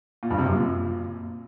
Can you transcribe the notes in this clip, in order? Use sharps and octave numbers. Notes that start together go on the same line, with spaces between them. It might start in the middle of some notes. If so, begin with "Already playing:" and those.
A#2
G2
C3
F#2
A#2